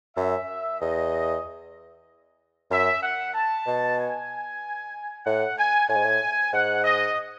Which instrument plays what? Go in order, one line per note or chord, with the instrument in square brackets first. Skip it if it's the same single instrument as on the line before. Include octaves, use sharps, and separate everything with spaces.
[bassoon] F#2 [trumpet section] E5
[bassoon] E2 [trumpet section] D#5
[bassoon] F#2 [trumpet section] E5
[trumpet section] F#5
A5
[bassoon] B2
[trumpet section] G#5
[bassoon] A2 [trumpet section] F#5
[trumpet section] G#5
[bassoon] A2 [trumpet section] G#5
[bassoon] G#2
A2
[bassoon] G#2 [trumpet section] F#5
[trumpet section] D#5